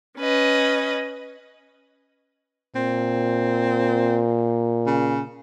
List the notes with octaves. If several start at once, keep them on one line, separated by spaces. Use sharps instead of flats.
C#4 B4 D#5
A#2 C4
C#3